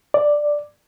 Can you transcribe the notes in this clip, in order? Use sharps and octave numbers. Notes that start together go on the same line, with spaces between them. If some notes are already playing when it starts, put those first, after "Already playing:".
D5